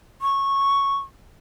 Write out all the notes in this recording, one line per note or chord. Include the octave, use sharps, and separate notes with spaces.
C#6